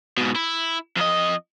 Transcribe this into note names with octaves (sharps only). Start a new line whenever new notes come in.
G#2 B2
E4
F2 D#5